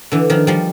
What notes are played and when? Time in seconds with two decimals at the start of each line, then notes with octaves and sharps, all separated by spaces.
0.12 D3 E3
0.30 D#3 F3
0.47 F3 G3